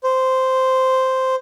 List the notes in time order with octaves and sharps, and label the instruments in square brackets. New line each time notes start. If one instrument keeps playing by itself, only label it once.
[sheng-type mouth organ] C5